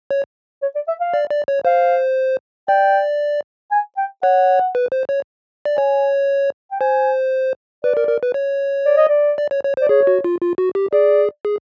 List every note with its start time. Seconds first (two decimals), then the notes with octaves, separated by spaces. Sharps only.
0.11 C#5
0.62 C#5
0.75 D5
0.88 E5
1.01 F5
1.14 D5
1.31 D5
1.48 C#5
1.65 C5 F5
2.68 D5 G5
3.71 G#5
3.97 G5
4.23 C#5 F#5
4.75 B4
4.92 C5
5.09 C#5
5.65 D5
5.77 C#5 G#5
6.71 G5
6.80 C5 G#5
7.84 B4 D5
7.97 A#4
8.09 A#4
8.23 B4
8.34 C#5
8.86 D5
8.97 D#5
9.09 D5
9.38 D5
9.51 C#5
9.64 C#5
9.77 C5
9.81 D5
9.89 G#4 C#5
10.07 F#4
10.24 F4
10.41 F4
10.58 F#4
10.75 G4
10.93 G#4 D5
11.45 G#4